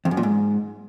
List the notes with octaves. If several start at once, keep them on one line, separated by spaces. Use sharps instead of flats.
F2
F#2
A#2
G#2